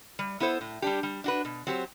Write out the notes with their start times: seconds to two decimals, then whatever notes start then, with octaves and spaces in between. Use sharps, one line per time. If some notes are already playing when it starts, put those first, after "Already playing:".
0.19 G3
0.40 B3 E4 A4 C5
0.61 A2
0.82 G3 D4 G4
1.03 G3
1.24 D4 F#4 B4
1.45 B2
1.67 F#3 C4 G4 C5